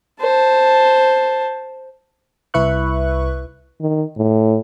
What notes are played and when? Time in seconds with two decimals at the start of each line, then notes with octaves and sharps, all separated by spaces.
0.21 C5 A5
2.54 C2 E4 B4 E5 C#6 F#6
3.81 D#3
4.17 A2